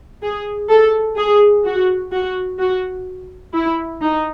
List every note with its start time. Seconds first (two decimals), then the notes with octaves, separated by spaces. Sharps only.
0.22 G#4
0.69 A4
1.17 G#4
1.65 F#4
2.12 F#4
2.59 F#4
3.54 E4
4.02 D#4